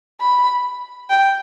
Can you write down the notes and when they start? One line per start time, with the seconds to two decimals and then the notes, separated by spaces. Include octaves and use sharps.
0.21 B5
1.10 G5